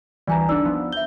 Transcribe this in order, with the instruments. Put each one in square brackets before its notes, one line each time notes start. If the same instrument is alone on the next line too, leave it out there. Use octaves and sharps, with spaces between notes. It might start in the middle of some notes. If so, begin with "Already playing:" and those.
[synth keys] D2 E3 G3 [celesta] D5 G#5 A#5
[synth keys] G1 D4 [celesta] D#4 D5 E6
[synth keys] F3 B3
[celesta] E5 G7 [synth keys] G6